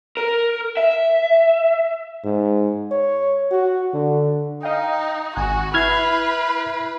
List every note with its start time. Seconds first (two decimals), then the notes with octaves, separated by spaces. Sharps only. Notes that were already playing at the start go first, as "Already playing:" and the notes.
0.17 A#4
0.77 E5
2.24 G#2
2.91 C#5
3.51 F#4
3.93 D3
4.63 D#4 D#5 F5 G5
5.36 G#1 F#4 G#5 F#6
5.74 E4 B4 E5 F6 G#6 C7